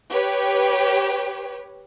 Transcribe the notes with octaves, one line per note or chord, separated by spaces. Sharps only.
G4 B4 C#5